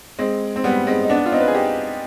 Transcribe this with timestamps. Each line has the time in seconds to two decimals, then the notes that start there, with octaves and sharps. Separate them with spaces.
0.19 G#3 C4
0.56 C4
0.64 G3 B3
0.87 G#3 C4
1.03 D#4
1.09 B3 D4
1.26 F4
1.32 C4 D#4
1.40 B4
1.47 G#4
1.55 D#4 G4